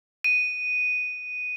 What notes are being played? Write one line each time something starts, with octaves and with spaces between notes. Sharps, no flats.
D#7